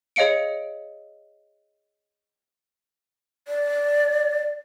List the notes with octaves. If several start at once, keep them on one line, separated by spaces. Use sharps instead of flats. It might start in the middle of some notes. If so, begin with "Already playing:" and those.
G#4 C#5 D#5 F5 C#7 D7
D5